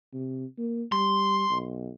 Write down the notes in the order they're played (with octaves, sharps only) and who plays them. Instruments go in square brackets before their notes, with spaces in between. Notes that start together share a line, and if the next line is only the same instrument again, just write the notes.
[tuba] C3
A#3
[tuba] G3 [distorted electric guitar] C6
[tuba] B1